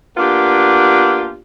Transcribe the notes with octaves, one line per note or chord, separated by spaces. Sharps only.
A#3 B3 D4 F4 G4